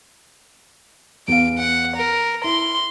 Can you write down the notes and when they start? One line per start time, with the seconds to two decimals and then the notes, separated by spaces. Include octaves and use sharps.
1.28 E2 F5 D7
1.58 F#5
1.96 A#4
2.44 E4 C6